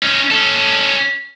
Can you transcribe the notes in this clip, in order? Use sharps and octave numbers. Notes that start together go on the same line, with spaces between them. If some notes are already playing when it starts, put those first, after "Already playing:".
C#4 D#4
C#4 A4